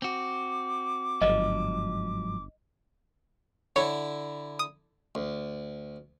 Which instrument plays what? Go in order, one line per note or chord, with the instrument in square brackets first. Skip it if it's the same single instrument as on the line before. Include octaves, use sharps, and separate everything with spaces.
[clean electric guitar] C4 F#4 [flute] D6
[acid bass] G1 [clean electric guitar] G#2 F3 F#3 [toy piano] D#5
[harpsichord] D3 E4 [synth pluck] C#5
[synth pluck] D#6
[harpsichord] D2